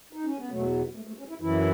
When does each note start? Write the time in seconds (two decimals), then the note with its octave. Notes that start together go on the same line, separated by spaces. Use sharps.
0.13 D#4
0.25 C#4
0.38 B3
0.50 E2 B2 F#3 A3
0.96 A3
1.07 A3
1.19 C#4
1.29 E4
1.41 F#2 E3 E4